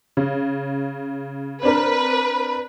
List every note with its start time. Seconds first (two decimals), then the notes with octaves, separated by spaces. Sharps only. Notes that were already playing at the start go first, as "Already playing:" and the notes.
0.17 C#3
1.63 C4 D4 A#4 B4